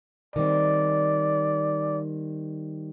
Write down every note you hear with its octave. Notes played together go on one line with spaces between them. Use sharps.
D#3 G3 C4 D5